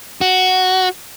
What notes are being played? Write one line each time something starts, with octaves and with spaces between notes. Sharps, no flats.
F#4